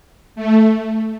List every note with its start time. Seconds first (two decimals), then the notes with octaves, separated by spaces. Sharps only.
0.36 A3